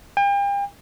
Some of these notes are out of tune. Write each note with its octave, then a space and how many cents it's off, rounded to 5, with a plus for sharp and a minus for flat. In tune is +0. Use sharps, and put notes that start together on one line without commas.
G5 +40